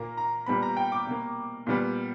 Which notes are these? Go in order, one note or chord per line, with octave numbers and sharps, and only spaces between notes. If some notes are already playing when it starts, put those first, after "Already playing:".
Already playing: A#2 A#3 A#5
A#5
A#2 G3 B3 B5
A#5
G5
D6
B2 A#3
A#2 G3 B3